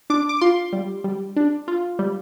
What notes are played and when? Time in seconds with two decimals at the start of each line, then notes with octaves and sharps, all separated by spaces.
0.10 D4 D6
0.29 D6
0.41 F4 C6
0.73 G3
1.04 G3
1.36 D4
1.68 F4
1.99 G3